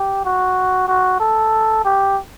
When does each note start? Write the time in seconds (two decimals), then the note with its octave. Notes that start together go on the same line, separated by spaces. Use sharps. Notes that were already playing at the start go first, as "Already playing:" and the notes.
Already playing: G4
0.25 F#4
0.88 F#4
1.20 A4
1.85 G4